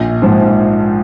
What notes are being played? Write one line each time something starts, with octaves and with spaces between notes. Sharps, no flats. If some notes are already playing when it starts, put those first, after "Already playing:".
Already playing: A#1
G#2 F3